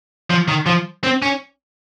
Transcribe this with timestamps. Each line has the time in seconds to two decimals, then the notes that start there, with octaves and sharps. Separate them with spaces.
0.30 F3
0.48 D#3
0.67 F3
1.04 C4
1.23 C#4